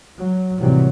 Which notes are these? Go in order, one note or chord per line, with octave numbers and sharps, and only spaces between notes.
F#3
D#2 A2 C3 E3 F#3 G3